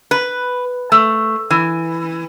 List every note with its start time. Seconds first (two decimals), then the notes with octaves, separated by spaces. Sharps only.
0.11 B4
0.92 A3
1.51 E3